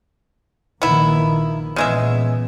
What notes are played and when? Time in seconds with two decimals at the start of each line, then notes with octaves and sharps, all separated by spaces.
0.82 A#1 D#3 A#3 B3 E4
1.76 A#2 C#3 E3 G#3 B3 E5